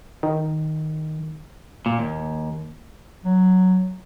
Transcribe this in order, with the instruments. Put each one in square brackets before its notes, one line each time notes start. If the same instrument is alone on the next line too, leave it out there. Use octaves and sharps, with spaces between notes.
[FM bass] D#3
[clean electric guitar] A#2
D#2
[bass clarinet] F#3